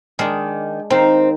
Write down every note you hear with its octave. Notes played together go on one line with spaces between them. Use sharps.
D#3 G#3 D4
D#3 C4 F5